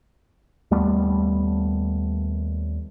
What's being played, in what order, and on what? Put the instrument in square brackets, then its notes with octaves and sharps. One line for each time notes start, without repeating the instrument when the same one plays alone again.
[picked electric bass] D#2 G3 A3 B3